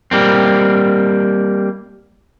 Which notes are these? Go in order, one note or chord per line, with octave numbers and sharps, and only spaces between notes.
G3 A#3 C4